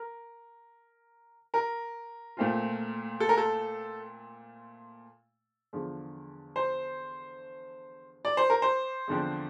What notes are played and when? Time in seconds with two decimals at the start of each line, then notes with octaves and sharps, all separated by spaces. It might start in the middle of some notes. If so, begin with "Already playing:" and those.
Already playing: A#4
1.54 A#4
2.37 A#2 A3 C4 F4
3.20 A4
3.29 A#4
3.37 A4
5.73 E2 D3 F3
6.56 C5
8.25 D5
8.37 C5
8.50 A#4
8.62 C5
9.07 E2 D3 F3 C4